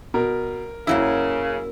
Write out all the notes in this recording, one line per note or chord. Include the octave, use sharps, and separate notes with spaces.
B2 A#4
F#2 C#3 F#3 A#3 E4